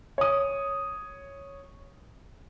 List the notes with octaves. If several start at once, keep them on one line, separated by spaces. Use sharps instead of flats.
C#5 D#6